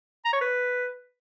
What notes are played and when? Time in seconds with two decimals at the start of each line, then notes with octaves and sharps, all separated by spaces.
0.25 A#5
0.33 C#5
0.41 B4